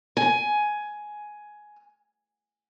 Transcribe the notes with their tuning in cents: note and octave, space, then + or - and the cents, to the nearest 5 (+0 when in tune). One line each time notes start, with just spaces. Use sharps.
G#5 +10